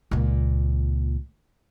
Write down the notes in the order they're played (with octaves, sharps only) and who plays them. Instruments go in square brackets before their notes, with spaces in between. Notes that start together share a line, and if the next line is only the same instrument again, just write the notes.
[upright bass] C#2 A#2